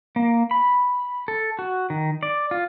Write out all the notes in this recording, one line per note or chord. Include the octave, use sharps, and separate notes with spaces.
A#3
B5
A4
F#4
D#3
D5
F4